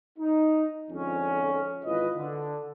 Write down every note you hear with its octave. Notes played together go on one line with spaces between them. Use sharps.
D#4
F2 G#2 D3 C#4
G#1 E3 F4 B4 D#5
D3